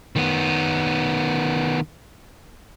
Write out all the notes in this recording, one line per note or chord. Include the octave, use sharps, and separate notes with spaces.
D#3 B3